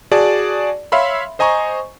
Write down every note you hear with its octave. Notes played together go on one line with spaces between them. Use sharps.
F#4 G#4 D5 A5
C#5 E5 F5 B5 C6
C5 D#5 G#5 A#5 C#6